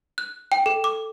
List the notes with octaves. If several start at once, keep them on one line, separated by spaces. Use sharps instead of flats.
F#6
G5
A4
D6